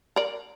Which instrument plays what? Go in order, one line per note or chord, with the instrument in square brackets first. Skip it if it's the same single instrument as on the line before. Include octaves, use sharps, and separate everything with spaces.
[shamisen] A#4 D5